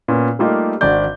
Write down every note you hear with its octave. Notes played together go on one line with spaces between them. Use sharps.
A#2 B3 C#4
G3 A3 A#3 D#4 F4 G4
G#1 D4 F#4 D5 G6